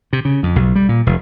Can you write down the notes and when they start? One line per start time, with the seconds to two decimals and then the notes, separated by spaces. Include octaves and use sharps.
0.13 C3
0.25 C#3
0.43 F2
0.56 B1
0.75 G3
0.89 A#2
1.06 F1